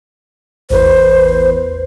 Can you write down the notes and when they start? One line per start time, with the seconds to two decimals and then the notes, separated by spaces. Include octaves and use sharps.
0.70 A1 E2 B4 C5